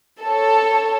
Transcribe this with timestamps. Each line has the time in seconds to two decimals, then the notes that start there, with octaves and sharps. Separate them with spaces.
0.21 A4 C#5